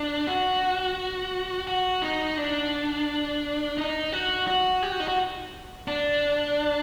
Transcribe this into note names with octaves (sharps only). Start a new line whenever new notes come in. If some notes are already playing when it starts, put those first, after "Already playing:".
Already playing: D4
F#4
F#4
D#4
D4
D#4
F#4
F#4
G4
F#4
D#4
F#4
D4